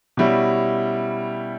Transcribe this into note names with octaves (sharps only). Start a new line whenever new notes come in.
B2 G3 C#4 E4